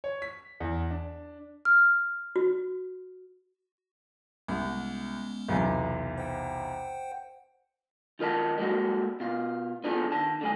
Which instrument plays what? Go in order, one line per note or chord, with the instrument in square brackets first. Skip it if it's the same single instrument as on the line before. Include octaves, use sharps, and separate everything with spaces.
[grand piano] C#5
B6
E2
D4
[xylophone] F6
[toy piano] F#4
[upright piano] C2 [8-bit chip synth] G#3 B3 C#4
[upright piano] B1 E2 C3
[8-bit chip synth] C5 F#5 G5
[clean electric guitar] D#3 F4 A#4 D#5 A5
G3 G#3 A#3 F#4 A4
B2 F4
B3 D4 F4 G#4 A4
D#3 A5
D3 G#3 G#5